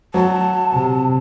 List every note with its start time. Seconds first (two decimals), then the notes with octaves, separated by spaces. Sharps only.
0.14 F#3 A5
0.73 C3